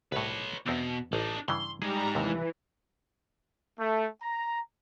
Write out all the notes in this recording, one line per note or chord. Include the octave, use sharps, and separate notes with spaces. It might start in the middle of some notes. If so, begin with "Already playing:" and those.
C2 A2 B4 C#5
E2 B2 C4 D4
A1 D4 D#4
G2 C#3 E3 C6
G3 G#3 D#4 G#4 A#5
D#2 C3 E3
A3
A#5